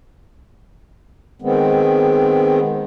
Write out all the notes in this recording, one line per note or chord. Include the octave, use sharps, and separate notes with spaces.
D#3 G#3 B3 C4